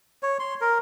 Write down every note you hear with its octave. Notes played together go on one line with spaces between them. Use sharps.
C#5
C6
A#4